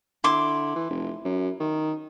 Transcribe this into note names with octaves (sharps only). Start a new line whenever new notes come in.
D3 E4 C6 D6
E3
F1
F#2
D#3